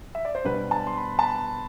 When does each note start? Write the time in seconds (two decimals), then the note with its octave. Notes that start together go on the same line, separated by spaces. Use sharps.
0.15 E5
0.25 D5
0.35 C5
0.45 B2 G3 B3 D4 B4
0.71 A5
0.87 C6
0.97 B5
1.19 A5
1.23 B5